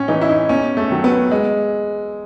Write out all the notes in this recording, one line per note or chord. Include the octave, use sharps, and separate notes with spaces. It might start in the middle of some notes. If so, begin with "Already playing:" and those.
Already playing: A2 C#4
E3 D#4
E4
D#4
E2 C#4
A3
D#3 F#3
B3
G#3